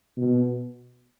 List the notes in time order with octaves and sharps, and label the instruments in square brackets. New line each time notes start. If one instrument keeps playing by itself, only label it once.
[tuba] B2